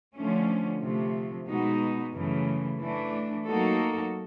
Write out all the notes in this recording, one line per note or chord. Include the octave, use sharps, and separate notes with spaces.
D3 F3 A3 C#4
C3 F3 A3
B2 G#3 B3 D#4 F#4
F#2 C#3 E3 A3
E3 A3 D4
F#3 A#3 D#4 F#4 A4